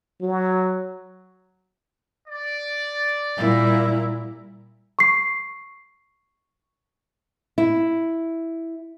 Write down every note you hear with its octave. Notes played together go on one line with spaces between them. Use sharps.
F#3
D5
A#2 G3 E4 A#4
C#6 C7
E4